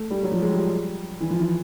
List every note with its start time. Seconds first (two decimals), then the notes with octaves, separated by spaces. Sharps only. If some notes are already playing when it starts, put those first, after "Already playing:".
Already playing: A3
0.10 G3
0.23 F#3
0.31 F3
0.42 G#3
0.51 G3
1.20 E3
1.30 F3
1.39 E3